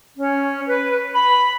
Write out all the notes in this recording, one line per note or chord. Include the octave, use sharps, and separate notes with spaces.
C#4
B4
B5